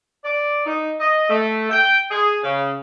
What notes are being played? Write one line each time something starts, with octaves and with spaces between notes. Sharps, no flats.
D5
D#4
D#5
A3
G5
G#4
C#3